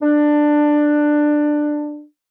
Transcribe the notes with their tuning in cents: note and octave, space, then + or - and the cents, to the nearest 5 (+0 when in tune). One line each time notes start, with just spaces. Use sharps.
D4 +15